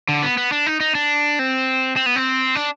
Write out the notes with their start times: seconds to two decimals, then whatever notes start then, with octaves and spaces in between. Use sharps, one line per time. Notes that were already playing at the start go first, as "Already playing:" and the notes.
0.09 D3
0.23 B3
0.37 B3
0.52 D4
0.66 D#4
0.80 D#4
0.95 D4
1.39 C4
1.96 C4
2.06 B3
2.16 C4
2.55 D4